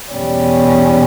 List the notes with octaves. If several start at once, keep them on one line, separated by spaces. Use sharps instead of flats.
E2 B2 G3 C#4